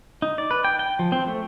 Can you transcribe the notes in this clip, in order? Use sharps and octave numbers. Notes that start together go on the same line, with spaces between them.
D#4
D5
B4
G5
G5
F3
C4
A3